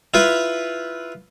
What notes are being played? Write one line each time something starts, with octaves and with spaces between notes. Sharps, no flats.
E4 F4 B4